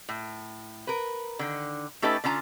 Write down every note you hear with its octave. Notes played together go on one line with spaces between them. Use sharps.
A2
A#4 B4
D3 D#3
A3 C#4 D#4 G4 A4 B4
D3 C#4 F4 A5 A#5